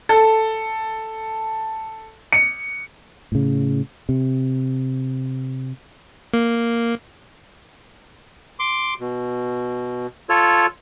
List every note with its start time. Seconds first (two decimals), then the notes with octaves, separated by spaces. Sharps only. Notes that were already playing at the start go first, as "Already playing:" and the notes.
0.09 A4
2.32 C#7
3.32 A2 C#3
4.09 C3
6.34 A#3
8.59 C6 D6
9.00 B2
10.29 F4 A4 C#5